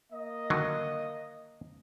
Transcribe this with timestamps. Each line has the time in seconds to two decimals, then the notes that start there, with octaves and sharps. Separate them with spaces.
0.13 A#3 D#5
0.50 D3 D#3 F#3